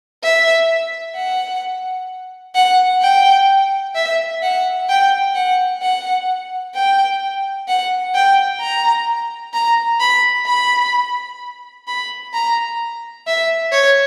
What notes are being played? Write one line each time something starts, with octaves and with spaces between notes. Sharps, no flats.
E5
F#5
F#5
G5
E5
F#5
G5
F#5
F#5
G5
F#5
G5
A#5
A#5
B5
B5
B5
A#5
E5
C#5